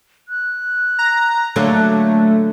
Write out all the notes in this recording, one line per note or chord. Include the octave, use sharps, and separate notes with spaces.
F#6
A#5
D3 F#3 A3 A#3